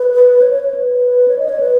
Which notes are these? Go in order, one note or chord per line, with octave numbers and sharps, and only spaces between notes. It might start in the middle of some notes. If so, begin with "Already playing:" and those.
Already playing: B4
C#5
C#5
C#5
B4
C#5
D#5
C#5
B4